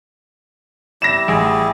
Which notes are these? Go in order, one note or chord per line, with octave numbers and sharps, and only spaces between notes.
G3 E4 G4 A#6 E7
A1 G#4